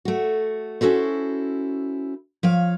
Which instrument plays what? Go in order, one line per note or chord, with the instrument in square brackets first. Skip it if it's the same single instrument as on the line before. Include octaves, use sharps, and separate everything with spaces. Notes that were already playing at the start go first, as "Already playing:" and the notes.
[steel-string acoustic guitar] A3 F#4
C#4 E4 F#4 A4 C5
F3 C#5 F5